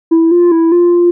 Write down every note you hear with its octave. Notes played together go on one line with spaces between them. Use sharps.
E4
F4
E4
F4